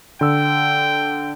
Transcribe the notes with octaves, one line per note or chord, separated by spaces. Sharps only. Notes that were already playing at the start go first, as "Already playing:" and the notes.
D3 G5 E6